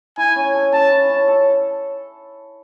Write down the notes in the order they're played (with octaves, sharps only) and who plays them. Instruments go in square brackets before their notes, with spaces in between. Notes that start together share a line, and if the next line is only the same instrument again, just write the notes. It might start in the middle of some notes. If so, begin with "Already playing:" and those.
[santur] E4 [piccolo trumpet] G#5
[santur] C#4
A4
[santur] C#4 [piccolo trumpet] A5
[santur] E4
C#4
A4